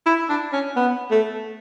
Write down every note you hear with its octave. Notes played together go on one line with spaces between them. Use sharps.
E4
D4
C#4
B3
A3